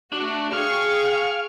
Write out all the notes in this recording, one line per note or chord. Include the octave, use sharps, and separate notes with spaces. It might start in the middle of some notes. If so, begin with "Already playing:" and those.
A3 D4 F#4
G#4 F5 G5 C#6